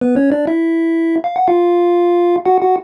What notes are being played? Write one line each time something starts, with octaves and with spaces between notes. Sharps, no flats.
B3 B4
C#4 C#5
D4 D5
E4 E5
F5
F#5
F4 F5
F#4 F#5
F#4 F#5